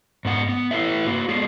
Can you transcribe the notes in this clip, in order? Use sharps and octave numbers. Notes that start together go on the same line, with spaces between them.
G#2 B3 F#5
B3
E4 A4 B4 E5
A#3 F#4
G#3 B3 G#4 A4